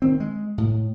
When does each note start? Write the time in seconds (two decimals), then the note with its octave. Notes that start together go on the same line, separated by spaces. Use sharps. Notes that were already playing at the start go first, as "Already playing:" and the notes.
0.02 D#3 C4
0.20 G#3
0.58 A2